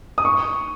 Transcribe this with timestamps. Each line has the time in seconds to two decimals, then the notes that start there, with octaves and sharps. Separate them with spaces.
0.18 D#6
0.25 C#6